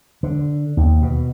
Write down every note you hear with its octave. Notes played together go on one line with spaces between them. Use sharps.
D3
D#2
B2